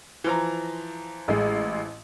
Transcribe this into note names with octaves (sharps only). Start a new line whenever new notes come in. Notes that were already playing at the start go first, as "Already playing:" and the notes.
E3 F3 A#5
A1 G#3